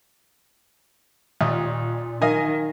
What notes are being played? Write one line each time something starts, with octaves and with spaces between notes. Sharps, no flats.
D#2 A#2 D#6
D#3 A#4 D#5 F5 G#5